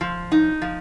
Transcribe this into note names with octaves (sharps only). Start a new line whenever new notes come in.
F3
D#4
F3